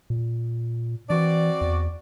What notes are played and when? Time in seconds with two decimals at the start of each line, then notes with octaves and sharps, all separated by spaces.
0.10 A#2
1.10 E3 C4 F#4 D5
1.61 E2